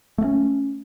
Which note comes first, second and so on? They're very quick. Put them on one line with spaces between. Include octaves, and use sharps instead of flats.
A3 A#3 C#4